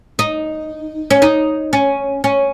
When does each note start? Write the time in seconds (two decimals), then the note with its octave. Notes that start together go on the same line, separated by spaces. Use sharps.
0.19 D#4
1.11 C#4
1.22 D#4
1.73 C#4
2.24 C#4